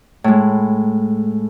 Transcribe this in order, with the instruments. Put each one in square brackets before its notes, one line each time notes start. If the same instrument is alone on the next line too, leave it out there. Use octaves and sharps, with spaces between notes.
[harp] A2 G#3